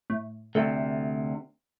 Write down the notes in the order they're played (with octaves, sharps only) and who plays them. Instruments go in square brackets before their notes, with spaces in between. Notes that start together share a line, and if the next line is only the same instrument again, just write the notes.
[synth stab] A2
[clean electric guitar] D2 C3 [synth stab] A3